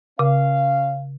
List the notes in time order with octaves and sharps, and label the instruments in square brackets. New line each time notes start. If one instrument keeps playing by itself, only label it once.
[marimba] C#3 [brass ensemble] C#4 F5